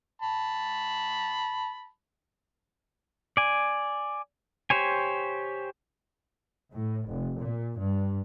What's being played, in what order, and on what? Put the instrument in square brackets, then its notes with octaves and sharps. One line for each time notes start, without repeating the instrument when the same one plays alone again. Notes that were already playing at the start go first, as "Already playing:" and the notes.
[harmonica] A5 B5
[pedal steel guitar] D5 G#5
G4 C5 C#5 G#5
[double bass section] A2
F1
A#2
G2